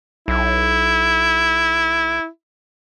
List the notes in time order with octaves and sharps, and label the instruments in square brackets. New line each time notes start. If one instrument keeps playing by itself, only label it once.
[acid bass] B1 [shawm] E4